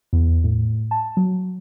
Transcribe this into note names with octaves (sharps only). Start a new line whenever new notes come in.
E2
A2
A5
F#3